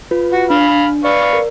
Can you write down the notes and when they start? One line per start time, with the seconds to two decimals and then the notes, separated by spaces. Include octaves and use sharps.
0.11 F4 B4
0.32 F#4
0.50 D4 F5 B5 F6
1.04 B4 D5 F5 C#6
1.33 A#4